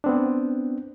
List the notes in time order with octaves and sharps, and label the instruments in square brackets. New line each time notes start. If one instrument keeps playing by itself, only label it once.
[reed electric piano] B3 C4 D4